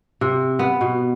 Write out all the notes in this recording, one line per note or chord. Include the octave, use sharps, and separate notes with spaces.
C3
B3
B2